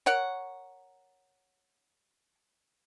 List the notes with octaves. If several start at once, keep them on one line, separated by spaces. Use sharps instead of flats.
A#4 C#5 F#5